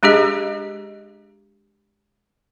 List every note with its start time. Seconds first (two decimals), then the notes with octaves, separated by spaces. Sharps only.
0.03 G#3 D4 G4 G#4 D#5